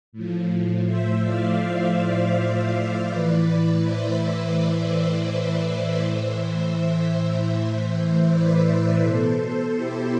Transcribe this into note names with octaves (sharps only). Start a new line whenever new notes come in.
A2 F3
C5 E5
D5 F5
C5 E5
C5 E5
A2 E3 B4 D5
C5 E5
B4 D5
C5 E5
A2 E3
C5 E5
C5 E5
B4 D5
B2 A4 C5
E4 G4